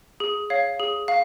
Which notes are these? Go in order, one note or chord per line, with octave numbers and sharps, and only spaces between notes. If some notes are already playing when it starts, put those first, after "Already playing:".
G#4
C#5 F5
G#4
F5